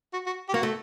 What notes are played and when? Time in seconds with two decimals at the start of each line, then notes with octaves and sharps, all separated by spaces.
0.13 F#4
0.26 F#4
0.49 G4
0.54 A#3 F#4
0.63 A3